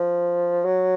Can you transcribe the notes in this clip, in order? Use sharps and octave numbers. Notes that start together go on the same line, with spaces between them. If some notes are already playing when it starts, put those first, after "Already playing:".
Already playing: F3
F#3